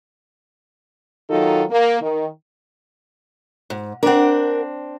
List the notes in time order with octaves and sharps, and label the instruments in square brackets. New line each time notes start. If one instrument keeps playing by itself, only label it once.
[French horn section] D#3 F#3 D#4 F4 F#4 A4
A#3
D#3
[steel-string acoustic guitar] G#2
[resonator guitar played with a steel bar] C4 D4 [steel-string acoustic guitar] A#4 F#5